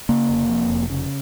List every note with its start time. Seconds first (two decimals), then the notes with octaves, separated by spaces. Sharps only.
0.09 C#3 A#3
0.29 F1
0.49 F2
0.70 F1
0.90 C#3